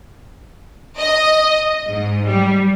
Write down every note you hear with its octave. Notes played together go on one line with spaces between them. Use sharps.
D#5
G#2
G3